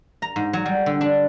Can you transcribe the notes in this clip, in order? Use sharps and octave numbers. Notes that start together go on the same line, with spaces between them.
A#5
G#2
F#3
G3
D3
D4